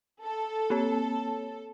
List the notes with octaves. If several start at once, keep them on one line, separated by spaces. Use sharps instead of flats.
A4
A#3 C4 C#5